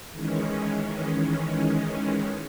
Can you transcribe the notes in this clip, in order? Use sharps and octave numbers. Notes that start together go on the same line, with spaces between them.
D#3 E3 G#3 C#4